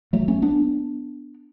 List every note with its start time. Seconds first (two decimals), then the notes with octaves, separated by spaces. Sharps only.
0.13 F#3 A3
0.28 A3 C#4
0.42 B3 D4